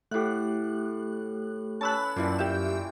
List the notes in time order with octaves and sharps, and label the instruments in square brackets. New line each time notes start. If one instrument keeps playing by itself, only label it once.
[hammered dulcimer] A2 F#5 [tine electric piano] A3 G4 [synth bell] F#6
[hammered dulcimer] C#4 B4 B5 [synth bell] A5 E6 F#6
[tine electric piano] F#2 [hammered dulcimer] A#2 E3 G3
[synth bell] G4 E5 [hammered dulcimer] G5